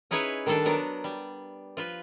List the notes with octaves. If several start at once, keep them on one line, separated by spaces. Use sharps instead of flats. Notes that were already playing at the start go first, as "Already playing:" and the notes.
C#4 D#4 E4 G#4 B4 C#5
D#3 G3 D4 A4 A5
F#3 B3 D4 A#4 A5
G3
F3 F4 B4